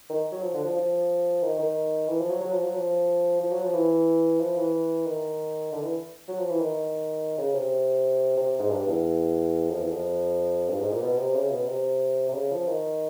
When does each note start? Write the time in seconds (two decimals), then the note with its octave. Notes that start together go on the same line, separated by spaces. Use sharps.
0.10 D#3
0.32 F#3
0.43 F3
0.54 D3
0.65 F3
0.76 F3
1.43 D#3
1.59 D#3
2.09 E3
2.20 F3
2.30 F#3
2.41 F#3
2.52 F3
2.63 F#3
2.75 F3
3.41 F3
3.52 F#3
3.63 F3
3.74 E3
4.40 F3
4.57 E3
5.06 D#3
5.72 D3
5.83 E3
6.28 F#3
6.39 F3
6.50 E3
6.61 D#3
7.38 C#3
7.54 C3
8.37 C3
8.59 G#2
8.71 G2
8.87 E2
9.70 F2
9.81 E2
9.92 F2
10.69 G2
10.80 G#2
10.91 A#2
11.02 B2
11.19 C3
11.35 C#3
11.51 B2
11.68 C3
12.29 C3
12.34 C#3
12.51 F3
12.68 D#3